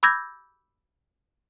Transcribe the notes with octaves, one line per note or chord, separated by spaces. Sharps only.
B5 D6 E6 G6 G#6 A#6